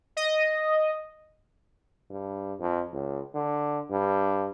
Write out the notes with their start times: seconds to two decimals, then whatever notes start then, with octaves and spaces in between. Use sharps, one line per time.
0.17 D#5
2.10 G2
2.59 F2
2.93 C#2
3.34 D3
3.91 G2